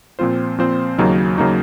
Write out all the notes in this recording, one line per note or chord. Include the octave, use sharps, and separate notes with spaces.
A#2 F3 C4 F4 C5
A#2 F3 C4 F4 C5
D#2 C#3 F#3 A#3 D#4
C#3 F#3 A#3 D#4